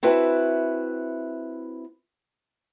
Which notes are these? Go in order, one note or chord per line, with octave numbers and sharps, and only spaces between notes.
C4 E4 F#4 B4 E5 A5